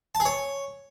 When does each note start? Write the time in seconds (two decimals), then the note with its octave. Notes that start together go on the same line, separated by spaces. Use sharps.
0.15 A5
0.20 G#4
0.25 C#5